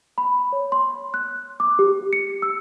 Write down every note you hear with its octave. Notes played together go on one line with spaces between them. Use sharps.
B5
C#5
C6
F#6
D6
G4
C#7
E6